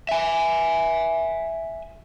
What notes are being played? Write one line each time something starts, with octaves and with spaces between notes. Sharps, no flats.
E5 G#5